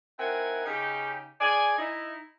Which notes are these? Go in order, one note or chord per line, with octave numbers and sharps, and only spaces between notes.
C4 D#4 E4 A#4 F#5 G#5
C#3 D#4 G4
G#4 D5 G#5
D#4 E4